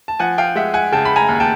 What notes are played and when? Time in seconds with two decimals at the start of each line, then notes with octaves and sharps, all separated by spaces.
0.08 A5
0.19 F3 F#5 G#5
0.38 F5 G5
0.56 G#3 E5 F#5
0.74 F#5 G#5
0.92 C#3 G5 A5
1.05 B5
1.16 G#5 A#5
1.28 D#2
1.40 G5 A5